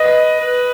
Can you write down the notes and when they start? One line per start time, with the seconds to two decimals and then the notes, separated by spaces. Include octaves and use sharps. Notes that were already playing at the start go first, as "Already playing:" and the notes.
Already playing: B4 D#5
0.39 B4